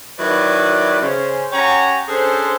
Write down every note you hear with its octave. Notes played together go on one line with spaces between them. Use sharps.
D#3 F#3 E4 B4 D5
C#3 C#4 C5
C#4 G4 C#5 F#5 G#5 A#5
C#4 D4 G#4 A4 C5